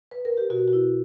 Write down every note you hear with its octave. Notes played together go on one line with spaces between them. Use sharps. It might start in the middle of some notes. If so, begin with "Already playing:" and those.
B4
A#4
G4
B2 F#4
F#4
E4